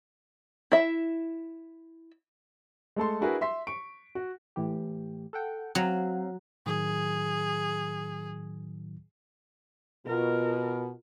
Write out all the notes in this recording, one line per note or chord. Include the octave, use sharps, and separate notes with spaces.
E4 E5
G#3 A3 A4 C6
D4 E4 F#4 G#4 A#4 B4
E5 C6 B6
C#6 D7
F#4
A2 E3 G4
A4 F#5 G5
F#3 C4 F5
A2 D#3 F#3 G#4
B2 F4 A#4